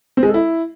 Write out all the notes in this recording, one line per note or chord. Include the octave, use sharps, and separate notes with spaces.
C4
G#3
A4
E4